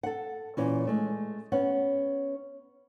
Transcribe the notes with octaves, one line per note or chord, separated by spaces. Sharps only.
A4 F#5
A#2 E3 C#4
G#3 A3
B3 C#4 F#5